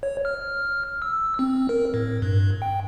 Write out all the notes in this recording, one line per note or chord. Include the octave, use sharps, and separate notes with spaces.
C#5
F6
E6
C4
A#4
A2
G2
G5